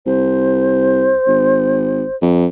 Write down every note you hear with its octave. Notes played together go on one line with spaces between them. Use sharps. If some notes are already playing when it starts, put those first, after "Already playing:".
C2 C5
G#1
F2